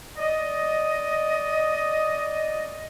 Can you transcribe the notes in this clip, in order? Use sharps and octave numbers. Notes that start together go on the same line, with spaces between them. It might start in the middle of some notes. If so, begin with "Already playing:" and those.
D5 D#5